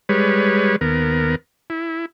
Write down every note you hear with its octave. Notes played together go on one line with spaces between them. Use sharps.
G3 G#3 B4 C#5
D#2 B3 A#4
E4